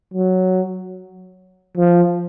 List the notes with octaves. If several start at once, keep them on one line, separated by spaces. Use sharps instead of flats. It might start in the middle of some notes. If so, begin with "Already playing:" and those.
F#3
F3